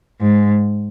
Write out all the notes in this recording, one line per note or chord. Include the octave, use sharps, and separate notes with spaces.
G#2